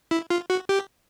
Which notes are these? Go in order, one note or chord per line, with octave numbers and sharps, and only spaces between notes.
E4
F4
F#4
G4